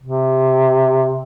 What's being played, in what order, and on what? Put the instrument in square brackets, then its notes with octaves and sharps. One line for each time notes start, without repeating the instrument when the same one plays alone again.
[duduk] C3